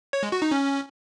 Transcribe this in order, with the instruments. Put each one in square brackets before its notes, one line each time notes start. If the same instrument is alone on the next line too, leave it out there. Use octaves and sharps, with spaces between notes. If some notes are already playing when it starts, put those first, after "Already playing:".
[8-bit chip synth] C#5
G#3
F#4
D#4
C#4